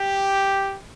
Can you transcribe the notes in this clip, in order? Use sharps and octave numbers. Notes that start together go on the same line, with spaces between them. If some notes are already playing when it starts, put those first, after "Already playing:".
Already playing: G4